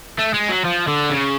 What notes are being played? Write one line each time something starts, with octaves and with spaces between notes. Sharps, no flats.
A3
G#3
F#3
F3
D3
C#3